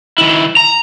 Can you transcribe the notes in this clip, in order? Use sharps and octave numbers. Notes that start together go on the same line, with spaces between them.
D#3 E4
A#5